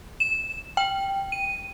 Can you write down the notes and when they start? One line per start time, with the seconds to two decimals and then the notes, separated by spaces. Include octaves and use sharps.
0.20 E7
0.77 G5
1.32 D#7